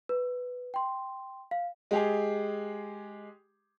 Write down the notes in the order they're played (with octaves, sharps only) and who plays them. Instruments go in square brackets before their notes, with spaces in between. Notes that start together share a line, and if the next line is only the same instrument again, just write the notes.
[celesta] B4
G5 C6
F5
[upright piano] G#3 G4 G#4